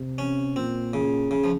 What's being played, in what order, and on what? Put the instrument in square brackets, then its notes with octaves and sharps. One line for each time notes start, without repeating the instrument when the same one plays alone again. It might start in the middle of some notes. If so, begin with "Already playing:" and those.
Already playing: [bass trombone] C3
[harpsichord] C#4
[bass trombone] A#2 [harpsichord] C4
[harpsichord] C#3
C#3
F3